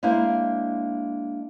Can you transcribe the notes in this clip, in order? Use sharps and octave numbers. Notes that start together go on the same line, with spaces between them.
G#3 A#3 D4 E4 C5